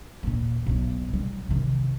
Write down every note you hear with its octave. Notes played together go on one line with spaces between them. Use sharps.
D#2 A#2
B1 B2
G3
C3 D#3